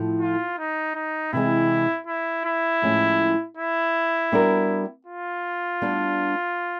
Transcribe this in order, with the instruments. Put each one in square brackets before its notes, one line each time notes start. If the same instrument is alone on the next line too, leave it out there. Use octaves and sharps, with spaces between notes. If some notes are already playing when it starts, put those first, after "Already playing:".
Already playing: [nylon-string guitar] A2 F3 A3
[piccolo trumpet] F4
D#4
D#4
[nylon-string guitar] C3 E3 G#3 [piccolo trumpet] E4
[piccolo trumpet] E4
E4
[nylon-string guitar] A2 F3 G#3 C#4
[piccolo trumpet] E4
[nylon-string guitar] G3 B3 D4 F#4 A#4
[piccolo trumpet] F4
[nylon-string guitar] G3 B3 D4